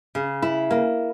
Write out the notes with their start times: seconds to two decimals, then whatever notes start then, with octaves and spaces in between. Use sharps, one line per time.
0.15 C#3
0.42 E4
0.71 A#3